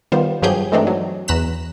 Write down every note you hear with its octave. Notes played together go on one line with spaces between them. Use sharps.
D#3 G3 B3 F4 C5
G2 F3 F#3 G4 G#4 G6
E3 G#3 A3 C4 D4 D#4
F#3
E2 A#5 F#6 B6 E7